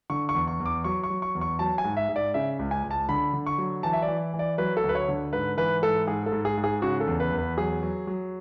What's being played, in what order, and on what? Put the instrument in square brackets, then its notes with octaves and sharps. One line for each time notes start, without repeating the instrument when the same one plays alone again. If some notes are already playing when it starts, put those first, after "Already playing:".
[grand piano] D3 C#6
C#6
E2
C#6
E2
D6
F#3 C#6
C#6
F#3
C#6
E2
C#6
F#3 A5
G#5
G#2
E5
G#2
D5
C#3 E5
C#2
G#5
C#2
A5
D3 B5
D3
C#6
F#3
E3 A5
E5
D5
E3
E3
D5
F#3 B4
A4
D2
B4
C#5
D3
G#2 B4
E3 B4
G#2 A4
G#2 G#4
A4
G#2
G#4
G#2
G#4
C#3 F#4
A4
E2
B4
E2
B4
F#3 G#4
F#3
F#3